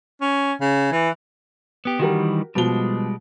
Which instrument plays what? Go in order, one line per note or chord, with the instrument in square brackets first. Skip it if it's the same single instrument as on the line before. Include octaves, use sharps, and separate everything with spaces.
[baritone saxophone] C#4
C#3
E3
[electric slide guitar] B3 G4
[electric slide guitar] D#3 E3 G3 [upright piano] F#4 G4 A#4
[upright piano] B2 F3 G7 [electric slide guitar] G3 G#3